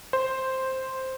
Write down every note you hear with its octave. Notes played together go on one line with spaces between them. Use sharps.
C5